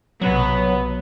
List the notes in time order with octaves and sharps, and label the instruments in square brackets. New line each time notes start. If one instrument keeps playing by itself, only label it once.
[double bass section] B1 C3 [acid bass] F#3 [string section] B3